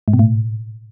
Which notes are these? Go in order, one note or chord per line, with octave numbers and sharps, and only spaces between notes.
G#2
B2
A2